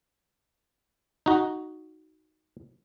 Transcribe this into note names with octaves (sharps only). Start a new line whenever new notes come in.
D#4 F#4